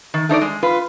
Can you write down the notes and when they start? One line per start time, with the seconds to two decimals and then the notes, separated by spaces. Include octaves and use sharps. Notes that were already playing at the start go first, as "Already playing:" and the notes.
0.14 D#3
0.29 A3 D#4 C#5 D5
0.42 G#3
0.63 F4 B4